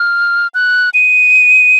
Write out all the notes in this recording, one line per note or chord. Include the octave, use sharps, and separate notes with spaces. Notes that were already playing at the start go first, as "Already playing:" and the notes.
Already playing: F6
F#6
D#7